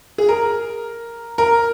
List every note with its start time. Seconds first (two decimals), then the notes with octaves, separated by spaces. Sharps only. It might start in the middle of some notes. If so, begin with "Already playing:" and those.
0.18 G#4
0.29 A#4
1.38 A#4